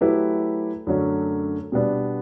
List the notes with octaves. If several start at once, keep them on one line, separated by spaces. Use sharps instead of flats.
F#3 A3 E4 G4 B4
F#2 D3 F#3 A3 C#4
B2 G3 B3 D4